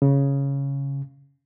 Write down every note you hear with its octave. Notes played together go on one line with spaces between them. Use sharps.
C#3